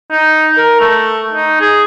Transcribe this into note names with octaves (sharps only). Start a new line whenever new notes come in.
D#4
A#4
A3
D#4
G#4